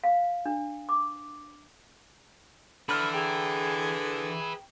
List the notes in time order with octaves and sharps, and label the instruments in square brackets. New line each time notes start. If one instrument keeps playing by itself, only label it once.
[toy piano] F5
D4
D6
[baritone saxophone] D3 [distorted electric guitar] B4 E5 [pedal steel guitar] B5 F6
[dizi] G#4 [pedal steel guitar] G5 A#5